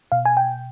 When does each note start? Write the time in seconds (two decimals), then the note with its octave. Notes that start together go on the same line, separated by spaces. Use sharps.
0.12 B2 F5
0.25 G#5
0.37 G5